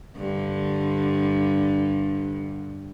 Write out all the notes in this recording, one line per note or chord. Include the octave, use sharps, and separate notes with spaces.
G2 D3